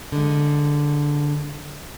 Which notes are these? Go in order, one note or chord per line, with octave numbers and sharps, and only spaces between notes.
D3 G#3